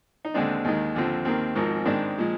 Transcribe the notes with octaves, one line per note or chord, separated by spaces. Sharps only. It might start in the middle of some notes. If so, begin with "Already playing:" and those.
D#4
D#2 D3 G#3 C4 D4
D#2 D#3 G#3
D#2 D3 F3 C4
D#2 D#3 A#3 C4
G#1 G#2 F3 A#3
G#2 D#3 G#3 C4 D4
A#2 F3 G#3